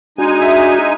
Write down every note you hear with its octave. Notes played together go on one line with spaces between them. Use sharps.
G#3 D4 D#4 F#4 G#5
E5